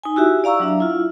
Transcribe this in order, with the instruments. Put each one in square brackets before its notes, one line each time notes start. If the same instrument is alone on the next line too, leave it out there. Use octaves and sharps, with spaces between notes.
[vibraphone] D#4 G#5
E4 F#4 G4 E5
D5 F5 A#5 C#6 E6
F#3 D4 E5
E4 F4